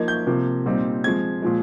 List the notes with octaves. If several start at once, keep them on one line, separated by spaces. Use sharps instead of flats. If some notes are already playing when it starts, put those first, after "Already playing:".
Already playing: F3 A#3 D#4 G#6
G6
C3 F3 A#3
A#2 G3 C4 D#4
F3 G#3 C4 G#6
A#2 F3 G#3